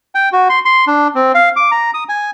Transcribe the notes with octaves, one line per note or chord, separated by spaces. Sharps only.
G5
F#4
C6
C6
D4
C4
F5
D6
A#5
D#6
G#5